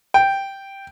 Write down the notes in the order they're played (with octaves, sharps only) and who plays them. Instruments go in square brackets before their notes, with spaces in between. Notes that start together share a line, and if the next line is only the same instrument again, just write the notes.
[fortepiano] G5